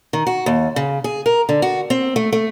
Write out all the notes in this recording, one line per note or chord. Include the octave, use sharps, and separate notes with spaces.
D#3
F#4
D#2
C#3
G#4
A#4
D3
F#4
C4
A3
A3